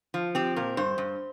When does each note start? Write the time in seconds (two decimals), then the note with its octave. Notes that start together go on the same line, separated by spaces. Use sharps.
0.14 F3
0.35 C4 G4
0.56 A#2 A#4
0.77 G2 C5
0.98 G2